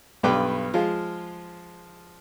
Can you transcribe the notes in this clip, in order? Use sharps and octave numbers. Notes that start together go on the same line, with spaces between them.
B1 G2 B4 G5 D6
F3 G#3 F4